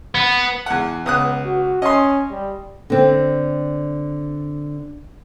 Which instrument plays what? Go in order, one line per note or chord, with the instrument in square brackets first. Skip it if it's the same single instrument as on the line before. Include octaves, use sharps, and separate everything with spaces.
[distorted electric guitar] B3
[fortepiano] E2 F#5
[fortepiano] C#2 D#6 F#6 [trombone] B3
[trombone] F#4
[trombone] C#4 [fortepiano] D#5 C6
[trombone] G3
[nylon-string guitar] D3 C4